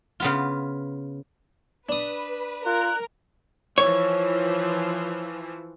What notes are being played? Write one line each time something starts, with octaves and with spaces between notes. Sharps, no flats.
C#3 B3 F4
D4 B4 D#6
F4 A#4 F#6
E3 F3 C#5